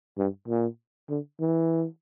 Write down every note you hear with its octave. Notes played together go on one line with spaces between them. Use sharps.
G2
A#2
D3
E3